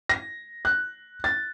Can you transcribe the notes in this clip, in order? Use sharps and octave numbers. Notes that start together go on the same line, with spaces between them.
A#6
F#6
A6